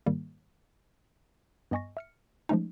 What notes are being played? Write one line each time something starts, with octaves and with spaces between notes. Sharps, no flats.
G#2 D#3 G3 A#3
G2 B3 D#5 G#5 C#6 A#6
E5 F6 C#7
F3 G#3 A3 C#4 D#4